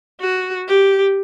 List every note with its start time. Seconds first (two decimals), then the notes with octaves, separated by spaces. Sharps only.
0.21 F#4
0.68 G4